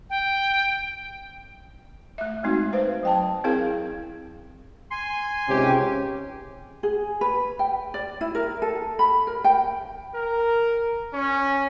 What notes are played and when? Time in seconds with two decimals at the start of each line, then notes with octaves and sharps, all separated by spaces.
0.10 G5
2.18 A3 E5
2.43 G#3 A3 C4 D#4 F#4
2.73 B4 C5 F5
3.03 F#3 G5 A5
3.44 C4 E4 G#4 A#4 F5
4.91 G#5 C6
5.49 C#2 G#2 C3 C#4 G4
6.83 G#4
7.21 B4
7.59 G5
7.94 D5
8.21 E4
8.35 A#4
8.62 A4
8.99 B5
9.27 A#4
9.44 G5
10.14 A#4
11.13 C#4